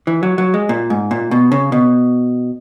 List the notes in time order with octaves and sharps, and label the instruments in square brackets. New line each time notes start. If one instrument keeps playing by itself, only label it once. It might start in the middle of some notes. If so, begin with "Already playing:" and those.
[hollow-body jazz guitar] E3
F#3
F#3
G#3
A#2
G#2
A#2
B2
C#3
B2